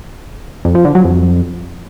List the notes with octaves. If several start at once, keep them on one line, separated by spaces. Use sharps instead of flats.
F2
F3
D3
F#3
F2